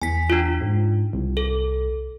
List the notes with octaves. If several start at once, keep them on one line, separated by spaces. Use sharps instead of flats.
E2 G#5 B6
D4 F4
G#2
C2
A4